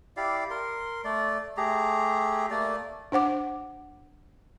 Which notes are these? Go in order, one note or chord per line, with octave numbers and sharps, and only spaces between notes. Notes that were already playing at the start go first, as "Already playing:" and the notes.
E4 G4 D5 F5
A#4 C6
A3 D5
A3 G4 G#4 A#5
A3 A#3 D5
D4 C5 F#5 D6